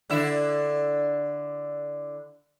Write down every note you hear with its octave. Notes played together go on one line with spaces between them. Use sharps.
D3 E4 E5